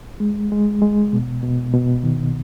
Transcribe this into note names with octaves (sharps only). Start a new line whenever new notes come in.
G#3
G#3
G#3
B2
B2
B2
D#3